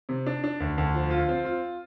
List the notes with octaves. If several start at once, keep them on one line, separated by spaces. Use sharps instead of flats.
C3
D4
D4
D2
D2
F3
F4
C4
F4